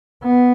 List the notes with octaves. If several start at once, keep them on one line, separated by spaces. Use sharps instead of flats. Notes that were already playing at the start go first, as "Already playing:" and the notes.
B3